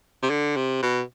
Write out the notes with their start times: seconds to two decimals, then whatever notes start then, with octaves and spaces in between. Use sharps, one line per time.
0.23 C3
0.30 D3
0.57 C3
0.82 B2